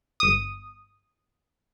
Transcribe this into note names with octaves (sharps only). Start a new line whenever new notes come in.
G1 D#6